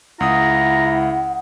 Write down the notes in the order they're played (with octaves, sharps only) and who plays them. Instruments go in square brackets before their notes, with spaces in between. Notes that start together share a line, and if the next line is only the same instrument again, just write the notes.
[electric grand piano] C#2 D#6 [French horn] E4 [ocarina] F#5 [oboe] A#5